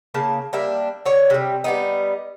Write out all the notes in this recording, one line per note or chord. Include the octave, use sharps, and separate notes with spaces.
C#3 A#3 A5
G3 A#3 D4 E5
D3 C#5
C3 G3
G3 B3 D#4